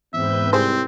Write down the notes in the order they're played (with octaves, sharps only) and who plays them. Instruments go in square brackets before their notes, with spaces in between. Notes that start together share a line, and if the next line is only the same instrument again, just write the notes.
[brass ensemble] E2 C4 [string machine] G#2 B4 G6 [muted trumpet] E5
[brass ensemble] C2 [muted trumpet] C4 [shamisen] G#4 C5